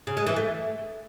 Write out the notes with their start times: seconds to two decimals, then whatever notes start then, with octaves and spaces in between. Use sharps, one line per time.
0.07 C#3
0.17 G#3
0.27 E3
0.36 A3